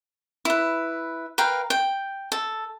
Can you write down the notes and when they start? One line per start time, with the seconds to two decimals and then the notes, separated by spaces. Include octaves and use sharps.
0.45 E4 B4
1.38 A#4 B4 F5 G5
1.70 G5
2.32 A4